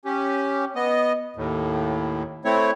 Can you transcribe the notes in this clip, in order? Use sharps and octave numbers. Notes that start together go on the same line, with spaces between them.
C#4 G4
B3 D#5
D#2 A2
A3 C4 E4 C#5